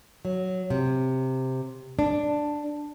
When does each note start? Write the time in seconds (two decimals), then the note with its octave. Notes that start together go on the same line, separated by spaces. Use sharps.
0.25 F#3
0.70 C3
1.99 D4